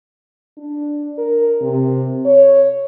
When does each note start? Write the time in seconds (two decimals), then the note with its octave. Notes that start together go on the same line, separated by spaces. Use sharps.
0.58 D4
1.18 A#4
1.62 C3
2.26 C#5